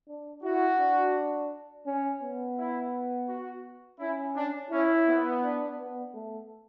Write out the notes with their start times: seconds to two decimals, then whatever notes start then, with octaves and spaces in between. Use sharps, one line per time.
0.08 D4
0.43 E4 F#4
0.79 D4
1.86 C#4
2.22 B3
2.57 E4
3.28 F#4
3.99 C#4 E4
4.36 D4
4.71 C#4 E4
5.07 B3
5.43 D4
5.79 B3
6.14 A3